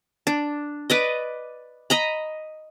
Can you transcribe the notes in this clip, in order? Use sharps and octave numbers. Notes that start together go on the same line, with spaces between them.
D4
B4 D5 D#5
D#5 A#5 B5